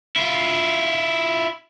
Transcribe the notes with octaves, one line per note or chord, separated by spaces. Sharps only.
E4 F4